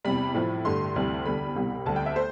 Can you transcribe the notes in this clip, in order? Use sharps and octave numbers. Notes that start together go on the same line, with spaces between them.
E2 C3 G3 B5
A2 F3 A3
G2 D3 A3 C6
D2 C3 E3 G3
E2 D3 G3 B5
C2 B2 G3
D2 D3 G3 A5
G5
E5
A3 C5